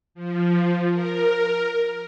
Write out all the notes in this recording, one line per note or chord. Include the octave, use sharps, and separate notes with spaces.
F3
A#4